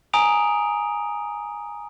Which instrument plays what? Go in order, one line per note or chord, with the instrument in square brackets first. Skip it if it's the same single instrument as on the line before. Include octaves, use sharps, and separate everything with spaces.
[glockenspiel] G#5 A#5 D#6 D7 F7